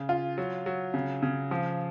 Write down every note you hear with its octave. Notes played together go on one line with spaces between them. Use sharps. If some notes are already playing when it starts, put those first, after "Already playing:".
Already playing: C#3
F4
F#3
F#3
C#3
C#3
F3